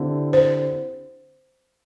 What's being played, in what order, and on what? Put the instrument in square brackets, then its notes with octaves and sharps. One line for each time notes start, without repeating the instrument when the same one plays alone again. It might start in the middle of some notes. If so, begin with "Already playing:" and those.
Already playing: [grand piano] D3 C4 E4 G4
[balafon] C5